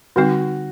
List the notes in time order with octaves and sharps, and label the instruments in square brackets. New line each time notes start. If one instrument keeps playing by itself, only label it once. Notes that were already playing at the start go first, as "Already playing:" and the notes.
[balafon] D3 G3 C4 D#4 [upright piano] F#4